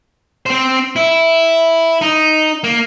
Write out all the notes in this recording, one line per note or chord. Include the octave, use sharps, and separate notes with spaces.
C4 C5
E4
D#4
A#3